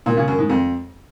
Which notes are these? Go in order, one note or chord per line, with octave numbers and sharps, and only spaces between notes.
A#2
C#3
F#2
G#2
F2